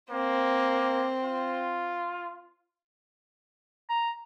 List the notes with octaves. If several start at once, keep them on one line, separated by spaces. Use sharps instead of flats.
A#3 C4
F4
A#5